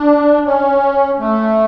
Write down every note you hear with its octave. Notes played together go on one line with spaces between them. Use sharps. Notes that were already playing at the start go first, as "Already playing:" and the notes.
Already playing: D4
C#4
A3